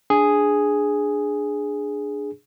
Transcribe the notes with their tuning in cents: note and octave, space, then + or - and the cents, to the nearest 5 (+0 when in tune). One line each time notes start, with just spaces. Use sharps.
D4 +0 G#4 +0